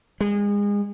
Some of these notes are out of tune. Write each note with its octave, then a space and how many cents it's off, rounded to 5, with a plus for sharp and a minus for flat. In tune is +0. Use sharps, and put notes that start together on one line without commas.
G#3 -30